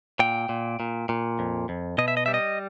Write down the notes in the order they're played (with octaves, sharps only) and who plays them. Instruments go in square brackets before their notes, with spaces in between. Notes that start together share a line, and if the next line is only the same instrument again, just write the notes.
[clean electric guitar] A#2 G5
A#2
A#2
A#2
F2
F2
B2 D#5
E5
D#5
G3 E5
D#5